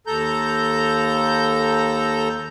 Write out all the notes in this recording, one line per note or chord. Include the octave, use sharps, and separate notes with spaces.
D#2 A4 A#5 G6